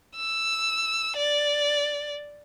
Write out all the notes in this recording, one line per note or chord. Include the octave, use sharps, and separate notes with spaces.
E6
D5